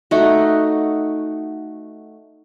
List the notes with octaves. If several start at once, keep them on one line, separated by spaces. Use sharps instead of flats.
A3 D#4 F#4